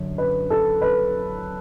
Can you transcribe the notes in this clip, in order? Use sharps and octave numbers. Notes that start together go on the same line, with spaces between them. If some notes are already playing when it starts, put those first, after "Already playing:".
Already playing: F#2 D3
B4
A4
B4